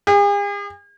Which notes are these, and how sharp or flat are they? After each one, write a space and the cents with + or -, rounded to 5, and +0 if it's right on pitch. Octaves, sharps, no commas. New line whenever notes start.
G#4 -45